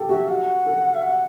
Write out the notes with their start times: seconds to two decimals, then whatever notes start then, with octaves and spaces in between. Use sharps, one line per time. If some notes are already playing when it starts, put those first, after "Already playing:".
Already playing: G4 A4
0.09 F#4 E5
0.28 F#5
0.66 A4
0.94 E5
1.02 F#5